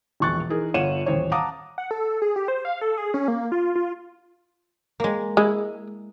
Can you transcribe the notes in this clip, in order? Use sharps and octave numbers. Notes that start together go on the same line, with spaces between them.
E1 A#1 C#6 F#6 A6
E3 D#4 G#4 A#4
G1 F4 C#5 F#5 D#7 E7
D#1 A1 C5 C#5
F5 F#5 A5 A#5 D6 D#6
F#5
A4
G#4
G4
C5
F5
A4
G#4
C#4
A#3
F4
F4
G#3 A#3
G#3 E4